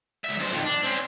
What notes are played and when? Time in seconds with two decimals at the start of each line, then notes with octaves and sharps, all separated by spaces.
0.24 C#2 E5
0.38 G2 C5
0.51 F2 D#3
0.64 D4
0.83 C4 C#4